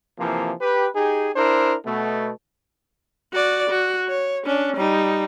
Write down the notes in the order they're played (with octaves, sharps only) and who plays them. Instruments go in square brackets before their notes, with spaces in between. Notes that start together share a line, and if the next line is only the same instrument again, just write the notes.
[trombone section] C3 E3 F3 A#3
G4 B4
D#4 G4 G#4
D4 E4 A#4 C5
B2 A3
[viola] F#4 D5
F#4
C#5
C#4 D4
G3 D#4